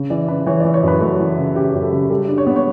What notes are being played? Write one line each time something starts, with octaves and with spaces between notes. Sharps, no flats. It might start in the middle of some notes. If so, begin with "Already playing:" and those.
Already playing: C#3
E3 D5
C#3 B4
E3 C#5
D5
E3
C#5
F#2 B4
A3 F#4
E3
C#3
C#3 G4
F#2 G4
A4
C#3
G3 A4
D4
C#5
B3
C#5